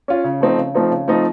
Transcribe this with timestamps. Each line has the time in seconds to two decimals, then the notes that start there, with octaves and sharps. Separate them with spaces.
0.08 C#4 F4
0.24 C#3
0.41 F3 A3 C4 D#4
0.58 C#3
0.74 F3 A3 C4 D#4
0.91 C#3
1.08 F3 A3 C4 D#4